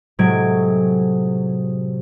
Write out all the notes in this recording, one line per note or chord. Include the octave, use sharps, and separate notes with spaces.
A2 C3 F#3 G#3 G#6 D7